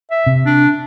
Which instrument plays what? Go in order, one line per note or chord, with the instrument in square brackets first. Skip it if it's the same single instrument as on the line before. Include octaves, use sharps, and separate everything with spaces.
[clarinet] E5
[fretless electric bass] C3
[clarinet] D4